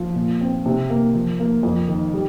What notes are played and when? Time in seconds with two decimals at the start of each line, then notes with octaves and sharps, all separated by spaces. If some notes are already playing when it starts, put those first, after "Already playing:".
Already playing: F3
0.15 A#2
0.41 C4
0.66 C3
0.90 A#3
1.15 F3
1.40 A#3
1.63 F2
1.88 D#3
2.14 G3